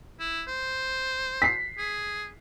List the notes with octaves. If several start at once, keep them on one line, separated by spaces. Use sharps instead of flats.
E4
C5
B6 C7
G#4